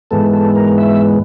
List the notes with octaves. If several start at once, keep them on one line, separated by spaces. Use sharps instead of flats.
G#2 E3 G#3 B3 A4
A4
A#4
E5